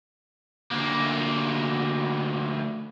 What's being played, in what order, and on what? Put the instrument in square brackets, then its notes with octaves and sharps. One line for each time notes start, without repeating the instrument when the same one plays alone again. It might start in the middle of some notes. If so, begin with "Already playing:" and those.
[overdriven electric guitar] D2 A#3